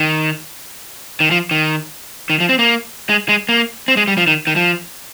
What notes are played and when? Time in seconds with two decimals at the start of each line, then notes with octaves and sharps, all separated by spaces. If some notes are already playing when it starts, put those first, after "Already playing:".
Already playing: D#3
1.20 D#3
1.31 F3
1.51 D#3
2.30 D#3
2.40 F3
2.49 C4
2.59 A#3
3.09 G#3
3.29 G#3
3.49 A#3
3.88 C4
3.97 G#3
4.08 G3
4.18 F3
4.27 D#3
4.47 D#3
4.56 F3